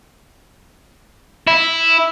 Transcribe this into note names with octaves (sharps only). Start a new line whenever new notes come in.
E4